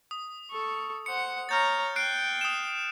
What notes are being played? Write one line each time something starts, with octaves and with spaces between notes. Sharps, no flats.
D#6
A4 C#6
C5 F#5 C#7
C#5 A#5 F6 G6 A6
G5 F#6 C7 D7
D#6 E7